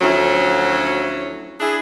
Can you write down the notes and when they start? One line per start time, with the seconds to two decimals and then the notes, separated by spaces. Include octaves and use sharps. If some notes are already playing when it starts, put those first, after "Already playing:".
0.01 D2 F3 F#3 C#4 E4
1.60 D4 E4 G#4